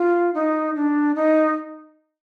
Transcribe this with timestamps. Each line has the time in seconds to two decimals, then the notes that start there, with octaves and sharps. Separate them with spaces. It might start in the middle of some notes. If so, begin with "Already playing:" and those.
Already playing: F4
0.34 D#4
0.75 D4
1.15 D#4